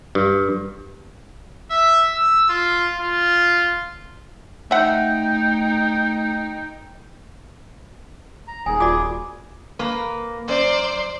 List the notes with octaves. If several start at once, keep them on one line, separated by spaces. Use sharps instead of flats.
G2
E5
E6
F4
F4
A3 D#4 E5 F#5 G5
A#5
D#1 G#4 G#5
F4 F#4 D5 G#5 D6
A#3 B4
F#2 C5 D5